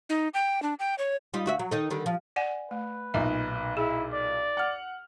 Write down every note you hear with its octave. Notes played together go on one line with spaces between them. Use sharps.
D#4
G5
D4
G5
C#5
G3 D#4 F4
D2 F#4 E5
F#3
D#3 D#4 A4
D3 D#3 G3
F3
D5 F#5 G#5
A3 B4
B1 A#2 D#4 E5
E4 G#4
D5
F#5 F6